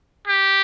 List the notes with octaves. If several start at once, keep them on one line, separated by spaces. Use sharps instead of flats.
G4